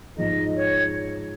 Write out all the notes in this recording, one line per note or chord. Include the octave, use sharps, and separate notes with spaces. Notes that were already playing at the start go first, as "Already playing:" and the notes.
G#2 F3 G#3 D#4 D#5
C#5